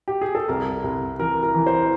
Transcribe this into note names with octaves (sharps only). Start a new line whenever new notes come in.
G4
G#4
A4
C2 A#4
C2
E3 A#4
A#4
E3
C5